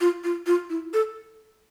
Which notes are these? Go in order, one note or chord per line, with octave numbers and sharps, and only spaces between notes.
F4
F4
F4
E4
A4